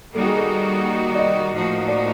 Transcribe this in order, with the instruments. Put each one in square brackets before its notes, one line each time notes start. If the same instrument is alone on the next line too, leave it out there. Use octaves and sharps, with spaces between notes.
[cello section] D#3 G3 A#3 D#4 F#4 [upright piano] A4
[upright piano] G#4
A4
D5
D#5
[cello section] A2 F3 A#3 D#4 F#4
[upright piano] D5